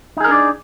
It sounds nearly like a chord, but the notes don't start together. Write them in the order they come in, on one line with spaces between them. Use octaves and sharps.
D#4 G#4 A#4 D4 D5